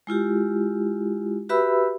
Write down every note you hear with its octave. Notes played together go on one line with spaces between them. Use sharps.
G#3 E4 F4 G4
F#4 G4 B4 E5 B5 E6